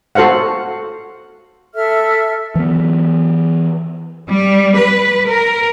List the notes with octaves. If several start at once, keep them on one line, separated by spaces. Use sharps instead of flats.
F#4 A4 C5 F5 F#5
A4 E5 F6
E3 F#3 A#3 B3
G3
B4
A#4